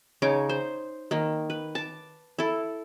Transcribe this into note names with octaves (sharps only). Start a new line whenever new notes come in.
C#3 D#4 C#5 D6
C5
D#3 A#3
B4
A5 D6
E4 A4